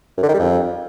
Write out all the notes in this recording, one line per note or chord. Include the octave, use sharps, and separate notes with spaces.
F#2
D3
D#3
G3
F2